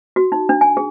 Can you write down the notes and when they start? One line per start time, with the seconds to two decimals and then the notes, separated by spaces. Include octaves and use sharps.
0.16 F#4
0.32 D#4
0.49 D4
0.61 G#5
0.77 G#4